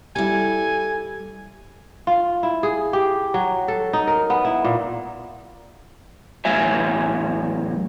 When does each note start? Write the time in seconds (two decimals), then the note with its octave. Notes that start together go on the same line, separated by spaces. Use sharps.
0.16 G3 E4 A4 G#5
2.07 F4
2.43 E4
2.63 G#4
2.93 G4
3.34 F#3
3.68 A4
3.93 D#4
4.07 A#4
4.30 B3
4.45 E4
4.64 A#2
6.45 E2 A2 F#3 E5 G#5